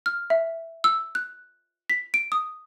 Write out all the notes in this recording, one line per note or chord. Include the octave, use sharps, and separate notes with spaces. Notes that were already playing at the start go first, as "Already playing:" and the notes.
F6
E5
E6
F#6
B6
D7
D#6